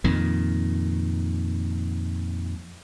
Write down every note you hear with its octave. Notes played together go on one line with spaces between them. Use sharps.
F2 A#2 D#3